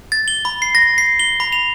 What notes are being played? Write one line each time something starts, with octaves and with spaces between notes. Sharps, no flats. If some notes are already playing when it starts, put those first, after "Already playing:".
A6
G7
B5
C7
A#6
C7
G7
B5
F7